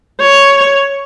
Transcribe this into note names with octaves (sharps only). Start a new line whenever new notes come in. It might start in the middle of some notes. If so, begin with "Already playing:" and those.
C#5